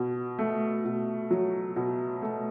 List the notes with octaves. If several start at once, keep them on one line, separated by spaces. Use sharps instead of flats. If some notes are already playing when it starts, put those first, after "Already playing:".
Already playing: B2
A3
B2
F#3
B2
A3